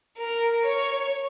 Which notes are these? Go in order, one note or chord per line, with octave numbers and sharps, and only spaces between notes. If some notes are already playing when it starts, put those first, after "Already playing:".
A#4
C#5